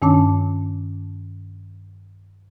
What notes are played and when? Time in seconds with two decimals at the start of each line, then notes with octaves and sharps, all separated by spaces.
0.02 G2 D#3 C#4 D4 A5 D6